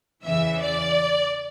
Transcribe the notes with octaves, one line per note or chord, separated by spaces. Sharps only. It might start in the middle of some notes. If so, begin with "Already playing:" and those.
E2 C#3 E3 E5
D5